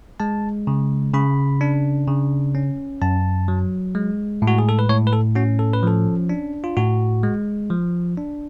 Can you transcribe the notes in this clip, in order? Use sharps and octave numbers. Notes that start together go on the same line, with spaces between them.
G#3 A5
C#3
C#3 B5
D4
C#3
C#4
F#2 A5
F#3
G#3
A2
F#4
G#4
A4
B4
A2 C#5
B4
A4
C#4 F#4
A4
B4
F3 A4
D4
F4
A2 F#4
G#3
F3
D4